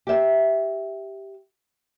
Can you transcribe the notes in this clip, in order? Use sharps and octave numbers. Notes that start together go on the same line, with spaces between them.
G4 E5